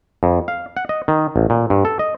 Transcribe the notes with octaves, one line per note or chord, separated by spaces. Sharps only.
F2
F5
F#5
D#5
D#3
A1
A#2
G2
A4
D#5